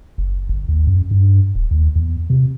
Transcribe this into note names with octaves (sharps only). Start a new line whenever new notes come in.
F#1
G1
D#2
F#2
G2
D#1
D#2
E2
C3